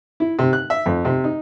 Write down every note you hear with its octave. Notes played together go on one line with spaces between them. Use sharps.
E4
C3
F#6
E5
F2
C3
D#4